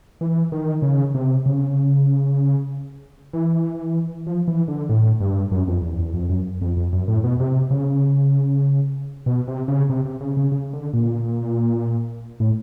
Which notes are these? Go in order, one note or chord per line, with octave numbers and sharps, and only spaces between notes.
E3
D#3
C#3
C3
C#3
E3
F3
E3
D3
A2
G2
F#2
F2
E2
E2
F2
F#2
F2
F2
F#2
A2
B2
C3
C#3
B2
C3
C#3
C3
C3
C#3
C#3
C#3
D3
A#2
A2